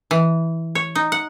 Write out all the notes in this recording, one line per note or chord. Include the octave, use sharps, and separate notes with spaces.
E3
C#5
D#4
F#5